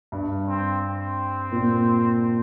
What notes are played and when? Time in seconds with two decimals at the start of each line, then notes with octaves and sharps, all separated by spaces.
0.12 G2
0.47 C4
0.81 C4
1.52 A#2